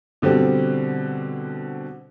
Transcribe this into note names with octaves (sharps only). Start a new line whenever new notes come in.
B2 D3 G3 C4